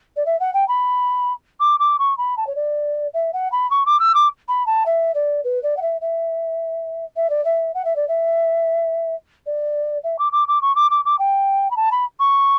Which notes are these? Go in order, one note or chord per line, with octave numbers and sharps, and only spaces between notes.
D5
E5
F#5
G5
B5
D6
D6
C#6
B5
A5
C#5
D5
E5
F#5
B5
C#6
D6
E6
D6
B5
A5
E5
D5
B4
D5
F#5
E5
E5
E5
D5
E5
F#5
E5
D5
E5
D5
E5
D6
D6
D6
C#6
D6
D6
D6
G5
B5
A5
B5
C#6